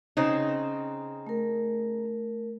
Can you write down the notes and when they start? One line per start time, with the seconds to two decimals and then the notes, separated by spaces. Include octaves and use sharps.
0.17 C#3 C4 D#4
1.27 A3 A#4